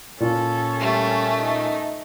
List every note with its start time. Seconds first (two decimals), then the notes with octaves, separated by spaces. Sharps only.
0.20 A#2 C#4 F4 A4
0.80 G3 A3
1.38 D#4